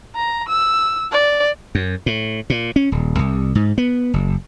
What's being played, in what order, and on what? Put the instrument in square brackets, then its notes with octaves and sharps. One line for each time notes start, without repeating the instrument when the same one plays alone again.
[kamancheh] A#5
E6
D5
[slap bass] F#2
A2
A#2
C#4
D#1
C2
G#2
B3
F#1